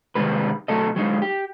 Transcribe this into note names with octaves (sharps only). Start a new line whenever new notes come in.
C3 D#3 G3 G#3 B4
B1 F#3 A3 A4 D#5
F#3 G#3 D#4
G4